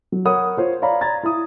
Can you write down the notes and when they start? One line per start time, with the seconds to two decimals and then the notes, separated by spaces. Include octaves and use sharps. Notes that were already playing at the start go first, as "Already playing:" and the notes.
0.12 F#3
0.25 A#4 C#5 F#5 B5 D#6
0.57 F4 C5 C#5
0.82 C#5 D5 F5 A#5 B5
1.01 A#5 G#6 A6
1.23 E4 D#6